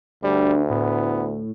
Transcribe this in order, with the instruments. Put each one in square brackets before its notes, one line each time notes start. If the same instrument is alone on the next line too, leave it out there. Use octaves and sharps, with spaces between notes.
[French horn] D2 [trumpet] G3 [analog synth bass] D4
[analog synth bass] A2 [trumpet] B3